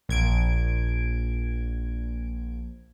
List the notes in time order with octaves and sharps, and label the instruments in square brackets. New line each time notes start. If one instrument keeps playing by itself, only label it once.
[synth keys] A#1 G#6 D7